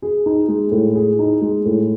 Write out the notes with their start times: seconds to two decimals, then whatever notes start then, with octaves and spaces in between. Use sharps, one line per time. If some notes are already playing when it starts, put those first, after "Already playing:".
0.02 G#4
0.26 D#4
0.48 G#3
0.71 A2
0.95 G#4
1.19 D#4
1.41 G#3
1.65 A2